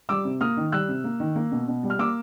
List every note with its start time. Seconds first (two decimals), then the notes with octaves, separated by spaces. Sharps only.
0.09 G3 D6 E6
0.25 C3
0.41 A#3 D#6 F6
0.57 D#3
0.72 G3 E6 F#6
0.89 C3
1.04 A#3
1.20 D#3
1.36 A#3
1.52 B2
1.68 B2
1.83 G3
1.90 F6
1.99 A#3 D6 E6